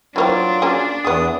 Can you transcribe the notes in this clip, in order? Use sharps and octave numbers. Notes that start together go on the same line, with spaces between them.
E3 F#3 A#3 C4 D4 F4
A#3 C#4 G#4
E2 B3 G#4 D#6